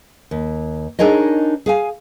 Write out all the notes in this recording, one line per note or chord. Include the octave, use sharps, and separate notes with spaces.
D#2
D4 D#4 G#4 A#4 C#5 D#5
G#4 F5 G#5